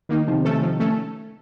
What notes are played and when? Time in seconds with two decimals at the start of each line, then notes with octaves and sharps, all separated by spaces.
0.09 D#3 A#3 D#4
0.27 C3 D#3 F3
0.45 A3 C#4 A4
0.62 F3
0.80 A3 C#4 A4